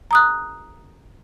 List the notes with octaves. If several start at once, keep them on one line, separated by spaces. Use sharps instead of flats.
A#5 D#6 F#6